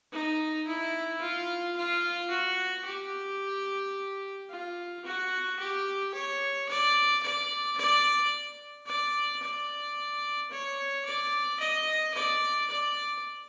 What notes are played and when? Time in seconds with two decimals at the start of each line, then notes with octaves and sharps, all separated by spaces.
0.12 D#4
0.67 E4
1.21 F4
1.76 F4
2.30 F#4
2.85 G4
4.50 F4
5.04 F#4
5.59 G4
6.14 C#5
6.69 D5
7.22 D5
7.77 D5
8.86 D5
9.42 D5
10.51 C#5
11.05 D5
11.60 D#5
12.14 D5
12.70 D5